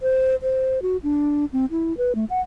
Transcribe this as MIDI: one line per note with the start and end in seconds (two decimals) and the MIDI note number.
0.02 0.35 72
0.43 0.82 72
0.82 0.97 66
1.03 1.45 62
1.53 1.65 60
1.71 1.96 64
1.97 2.15 71
2.15 2.25 57
2.30 2.41 78